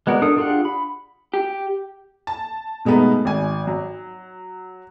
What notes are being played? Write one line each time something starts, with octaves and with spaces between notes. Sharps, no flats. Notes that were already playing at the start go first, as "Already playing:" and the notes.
G#3 B3 F#4 A#4 D5
D4 A4 A#4 D#6
D4 F4 G4 G#4 F#5
B5
G4
A5
B2 G#3 A3 B3 D#4
G#1 G#5
F#3